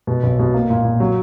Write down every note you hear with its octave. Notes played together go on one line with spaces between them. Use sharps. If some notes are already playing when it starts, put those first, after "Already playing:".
B2
B1
B2
A#3
A#2
A#2
F#3